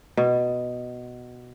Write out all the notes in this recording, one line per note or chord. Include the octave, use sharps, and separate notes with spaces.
B2